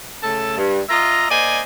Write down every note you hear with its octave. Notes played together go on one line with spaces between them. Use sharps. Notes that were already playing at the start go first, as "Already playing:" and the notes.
C#3 A3 A4 A5
G2
F4 D#5 E5 A#5
A#3 C5 D5 D#5 G#5